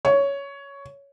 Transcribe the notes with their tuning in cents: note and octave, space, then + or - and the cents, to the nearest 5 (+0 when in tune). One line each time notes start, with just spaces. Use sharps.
C#5 +10